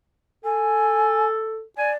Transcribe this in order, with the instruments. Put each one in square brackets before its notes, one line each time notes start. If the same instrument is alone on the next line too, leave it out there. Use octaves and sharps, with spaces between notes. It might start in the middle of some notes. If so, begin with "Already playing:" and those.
[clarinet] A4 [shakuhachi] G#5
[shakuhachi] D5 [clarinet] G#5